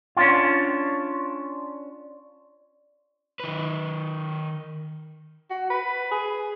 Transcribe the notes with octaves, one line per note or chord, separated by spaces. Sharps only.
C#4 D4 F4
D#3 B4
F#4
B4
G#4